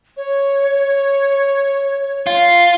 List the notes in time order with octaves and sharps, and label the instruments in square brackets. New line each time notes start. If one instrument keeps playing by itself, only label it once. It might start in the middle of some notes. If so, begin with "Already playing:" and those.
[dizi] C#5
[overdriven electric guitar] F4